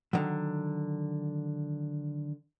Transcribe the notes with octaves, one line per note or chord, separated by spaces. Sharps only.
D3 D#3 F#3